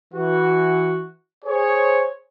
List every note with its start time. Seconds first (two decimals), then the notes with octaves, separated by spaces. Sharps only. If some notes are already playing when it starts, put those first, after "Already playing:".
0.14 E3 F#4
1.45 G#4 C5 C#5